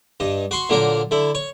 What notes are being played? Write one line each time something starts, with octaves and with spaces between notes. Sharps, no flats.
G2 D#5
F#4 C6 C#6
A#2 D3 F#3 A#3 A#4
D3 E4
C#5